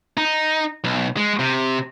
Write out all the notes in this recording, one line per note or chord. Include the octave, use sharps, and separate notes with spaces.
D#4
B1
G#3
C3